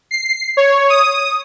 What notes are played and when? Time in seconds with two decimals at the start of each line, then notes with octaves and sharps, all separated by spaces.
0.11 C7
0.57 C#5
0.90 D#6